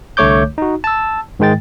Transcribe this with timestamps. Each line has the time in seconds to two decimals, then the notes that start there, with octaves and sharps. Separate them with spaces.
0.17 C2 D3 A3 C#5 D6 G6
0.58 D#4 F#4
0.84 A5 E6
1.39 G#2 D#3 G#3 G5 A6